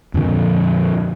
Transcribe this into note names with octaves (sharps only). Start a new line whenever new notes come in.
F2 A#2 D3 F3